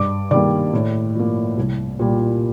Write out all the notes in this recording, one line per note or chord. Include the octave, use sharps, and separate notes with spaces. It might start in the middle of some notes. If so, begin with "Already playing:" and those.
Already playing: G2 D5 D6
D#3 G3 A#3 D5 D6
A2
F3 A#3
C2
A#2 G3